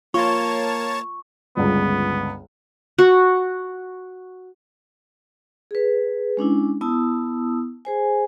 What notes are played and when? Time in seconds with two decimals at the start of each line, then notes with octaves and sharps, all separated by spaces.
0.14 A#3 F4 C#5 A5 C#6
1.57 G1 C#2 B3
2.99 F#4
5.71 G#4 B4
6.37 G#3 C#4 D4 E4
6.81 B3 E4 A5 D#6 E6
7.85 G#4 C5 G#5